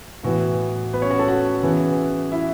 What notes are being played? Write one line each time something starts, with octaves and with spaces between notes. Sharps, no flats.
A2 E3 B3 F#4
B3 B4
C#4 C#5
F#4 F#5
A4 A5
F#4 F#5
C#3 E3 B3
E4 E5